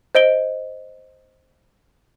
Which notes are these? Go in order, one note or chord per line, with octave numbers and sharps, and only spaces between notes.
C5 D#5 D7 G7